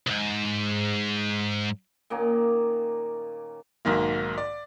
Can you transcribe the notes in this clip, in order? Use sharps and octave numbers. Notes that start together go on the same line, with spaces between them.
C2 G#2
A#2 D#3 A#3 C#4
B1 G#2 D#3 A#3
D5